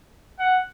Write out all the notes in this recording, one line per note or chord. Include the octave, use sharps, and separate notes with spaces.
F#5